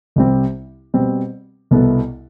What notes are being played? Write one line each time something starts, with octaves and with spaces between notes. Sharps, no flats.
C2 C3 G3 C4 G4
B2 G3 C4
C2 B2 B3 E4 A4